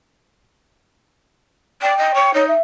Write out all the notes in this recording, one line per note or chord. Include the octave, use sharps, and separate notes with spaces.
D5 G5
D#5
C#5
D#4 C#5
E5